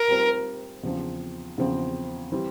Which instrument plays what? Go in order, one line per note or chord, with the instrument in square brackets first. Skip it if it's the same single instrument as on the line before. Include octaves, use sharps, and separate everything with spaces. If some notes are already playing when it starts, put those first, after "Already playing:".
Already playing: [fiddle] A#4
[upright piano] G3 C4 F4 C5
E2 C#3 F3 C4
E2 C#3 F3 C4
E3 G3 C4